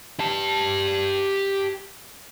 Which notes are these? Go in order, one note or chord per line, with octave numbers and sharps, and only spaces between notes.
G4 A5